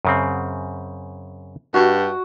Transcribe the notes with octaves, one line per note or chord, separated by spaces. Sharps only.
F#2 C#3 C4
G2 F#4